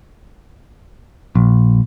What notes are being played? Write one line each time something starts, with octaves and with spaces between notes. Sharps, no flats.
A#1